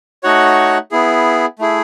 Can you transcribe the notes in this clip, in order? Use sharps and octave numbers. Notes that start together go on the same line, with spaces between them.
A3 D#4 F#4 C#5 F#5
B3 E4 G#4
A3 E4 G#4